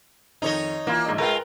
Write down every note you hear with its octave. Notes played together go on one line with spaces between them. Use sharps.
F2 D#3 D#4 C#5 D#5
E3 A#3 F4
A#1 G#2 D#5
G#3 F4 A#4 B4 G5